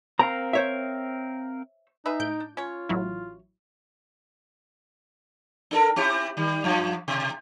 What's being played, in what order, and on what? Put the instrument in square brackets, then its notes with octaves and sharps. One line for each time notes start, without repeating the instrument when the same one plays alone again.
[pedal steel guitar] C4 A#4 F5 [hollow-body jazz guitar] A#5
[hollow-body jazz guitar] C5 C#5 E5
[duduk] D#4 [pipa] G#4 B4 E5
[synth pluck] A2 G6 D7
[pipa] D4
[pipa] C#4 C#5 [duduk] F4
[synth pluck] A1 F#3 E4
[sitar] D4 A4 A#4
C4 E4 G4
D#3 G3
F#2 F3
B2